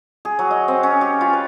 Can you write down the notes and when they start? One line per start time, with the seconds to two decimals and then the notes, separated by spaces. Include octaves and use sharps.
0.25 G#4
0.39 F#3
0.51 D#5
0.68 C4
0.83 C#4
1.01 G4
1.21 F4
1.33 B4